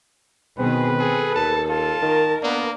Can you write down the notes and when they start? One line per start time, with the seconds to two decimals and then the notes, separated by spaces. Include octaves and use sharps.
0.58 B2 D#3 C4 G#4 B4
0.99 G#4 A4
1.35 D#2 A5
1.69 F4 A5
2.02 D#3 A#4
2.43 A#3 B3 D4